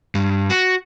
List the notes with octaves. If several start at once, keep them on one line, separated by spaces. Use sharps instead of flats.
G2
F#4